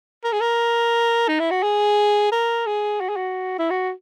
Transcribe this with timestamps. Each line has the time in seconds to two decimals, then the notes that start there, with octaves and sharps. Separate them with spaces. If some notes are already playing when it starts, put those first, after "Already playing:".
0.24 A#4
0.32 G#4
0.41 A#4
1.28 D#4
1.40 E4
1.51 F#4
1.63 G#4
2.32 A#4
2.66 G#4
3.01 F#4
3.09 G#4
3.16 F#4
3.59 E4
3.70 F#4